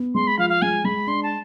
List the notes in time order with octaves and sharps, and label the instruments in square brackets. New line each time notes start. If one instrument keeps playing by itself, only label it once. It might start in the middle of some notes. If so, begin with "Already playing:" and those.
Already playing: [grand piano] B3
[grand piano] G#3 [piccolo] C6
[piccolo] B5
[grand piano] F3 [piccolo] F5
[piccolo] F5
[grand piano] G#3 [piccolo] G#5
[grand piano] G#3 [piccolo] B5
[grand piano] D4 [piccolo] C6
[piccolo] A5